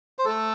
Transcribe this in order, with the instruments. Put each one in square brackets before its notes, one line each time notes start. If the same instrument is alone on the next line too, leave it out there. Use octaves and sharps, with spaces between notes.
[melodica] C5
[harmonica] A3 [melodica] A4